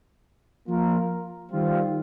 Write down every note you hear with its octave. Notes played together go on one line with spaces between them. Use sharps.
F3 A#3 F4 A#4
D#3 G3 C4 F4